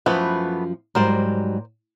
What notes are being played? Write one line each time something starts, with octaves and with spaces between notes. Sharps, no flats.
F#2 E3 F3 A3 B3
G#2 F#3 G3 A#4 C5 D5